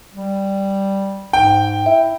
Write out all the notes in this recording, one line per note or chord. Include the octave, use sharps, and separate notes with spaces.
G3
G#2 G5
E4 E5